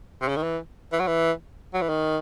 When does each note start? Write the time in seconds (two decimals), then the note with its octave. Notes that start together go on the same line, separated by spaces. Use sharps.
0.22 C3
0.28 C#3
0.37 D#3
0.43 E3
0.92 E3
1.00 F#3
1.07 E3
1.74 F#3
1.82 E3
1.89 D#3